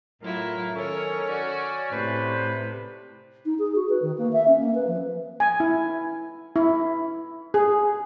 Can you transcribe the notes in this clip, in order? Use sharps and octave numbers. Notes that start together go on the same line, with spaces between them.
A2 F#3 E4 F4 A#4
D#3 C#4 A4 A#4 C#5
F#4 D5
A2 C3 B4 C5
D#4
G#4
F#4
B4
D#3
A#3
E5
C#4
A#3
B4
F3
G#5
E4
E4
G#4